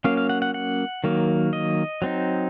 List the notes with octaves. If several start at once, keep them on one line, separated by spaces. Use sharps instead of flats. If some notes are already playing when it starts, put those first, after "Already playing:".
F#3 A#3 C#4 F5
F5
F#5
F#5
F#5
D#3 F#3 A#3
D#5
F#3 C4 D#4